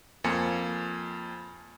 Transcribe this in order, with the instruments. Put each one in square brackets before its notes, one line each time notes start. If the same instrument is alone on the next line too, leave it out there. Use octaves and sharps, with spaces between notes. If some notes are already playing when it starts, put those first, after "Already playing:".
[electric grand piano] F2 A#3 F4 G#5 C#7